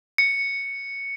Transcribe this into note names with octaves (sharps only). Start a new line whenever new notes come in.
C#7